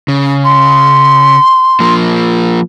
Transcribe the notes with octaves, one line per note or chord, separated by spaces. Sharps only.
C#3
C6
F3 A#3